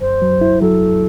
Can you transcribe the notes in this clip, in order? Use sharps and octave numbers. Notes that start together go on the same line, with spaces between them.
F#2 C5
F#3
E4
F#3 A4